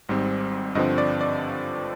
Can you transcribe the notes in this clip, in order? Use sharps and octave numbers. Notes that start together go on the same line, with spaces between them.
G#1 G#2 G3 C4
G2 D3 F3 C4 D#5
D5
D5